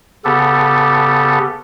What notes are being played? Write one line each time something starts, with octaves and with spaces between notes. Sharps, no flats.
C#3 B3 G4 A4